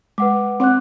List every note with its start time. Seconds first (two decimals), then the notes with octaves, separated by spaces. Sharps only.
0.18 G#3 B4 F#5 D6
0.60 C4 C#5 F#5 D6 F#6